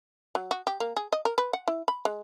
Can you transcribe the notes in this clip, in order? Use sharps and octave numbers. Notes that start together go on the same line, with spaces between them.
F#3
F#4
G4
A#3
G#4
D#5
A#4
B4
F#5
E4
B5
G#3